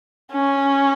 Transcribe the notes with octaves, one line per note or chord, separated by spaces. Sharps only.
C#4